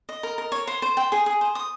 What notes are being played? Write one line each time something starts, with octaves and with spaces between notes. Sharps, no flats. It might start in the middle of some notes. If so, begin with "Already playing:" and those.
D#5
A#4
A#4
C#5
C5
C5
G5
G#4
G#4
C5
D#6